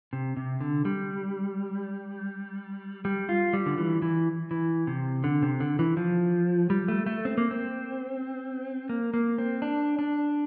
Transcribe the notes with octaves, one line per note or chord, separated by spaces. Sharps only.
C3
C3
D3
G3
G3
F4
G3
D3
E3
E3
E3
C3
D3
C3
D3
E3
F3
G3
A3
A3
C4
A#3
C4
A#3
A#3
C4
D4
D4